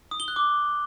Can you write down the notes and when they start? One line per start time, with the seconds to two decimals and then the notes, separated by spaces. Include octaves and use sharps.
0.11 D#6
0.20 G7
0.28 F#6
0.36 D6